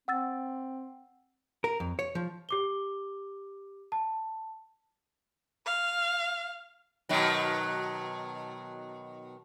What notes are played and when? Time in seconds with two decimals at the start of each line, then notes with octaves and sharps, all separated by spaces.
0.08 C4 F#5 E6 A6
1.64 A#4
1.80 F2
1.99 C#5
2.15 F3
2.49 G4 D6 G7
3.92 A5
5.65 F5
7.09 B2 D#3 F#3